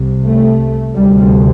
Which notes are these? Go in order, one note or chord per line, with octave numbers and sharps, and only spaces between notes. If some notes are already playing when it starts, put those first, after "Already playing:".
Already playing: C2 C3
A3
D2 C3 G3